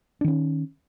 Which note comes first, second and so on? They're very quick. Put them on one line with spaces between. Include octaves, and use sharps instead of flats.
D4 D#3 C#4